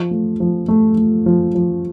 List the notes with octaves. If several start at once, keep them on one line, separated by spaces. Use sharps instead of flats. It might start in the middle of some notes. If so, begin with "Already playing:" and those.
Already playing: F3
A3
F3
A3
A3
F3
F3